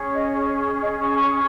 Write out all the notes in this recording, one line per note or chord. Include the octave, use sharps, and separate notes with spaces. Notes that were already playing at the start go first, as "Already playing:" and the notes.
Already playing: C#4 G#4 C#5
D#5
C#5
D#5
C#6